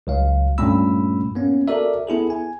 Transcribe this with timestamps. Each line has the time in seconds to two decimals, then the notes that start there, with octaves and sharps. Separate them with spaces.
0.07 C#2 F#3 F5
0.58 G2 A#2 A3 C#4 B5 E6
1.35 A#3 B3 C#4
1.68 F#4 A4 A#4 D5 E5
2.07 B3 E4 G#4 A4
2.30 G#5